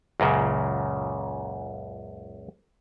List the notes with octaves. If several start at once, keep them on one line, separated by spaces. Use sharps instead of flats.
C#2 F#2 A#2 C#3